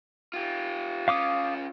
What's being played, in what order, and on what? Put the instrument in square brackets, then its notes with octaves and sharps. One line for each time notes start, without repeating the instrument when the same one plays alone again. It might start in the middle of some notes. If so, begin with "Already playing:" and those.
[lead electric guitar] F4 G4
[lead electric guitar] C#4 F4 [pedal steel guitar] F5 D6 D#6